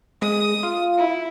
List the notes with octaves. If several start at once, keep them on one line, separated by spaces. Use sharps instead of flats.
G#3 D#6
F4
E4